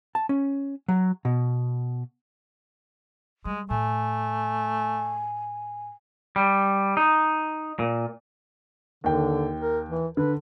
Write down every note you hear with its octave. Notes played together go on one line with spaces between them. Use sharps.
A5
C#4
F#3
B2
G3 G#3
A2 A3 G#5
G3
D#4
A#2
D#2 D3 G5
A#4
E3
D3 B4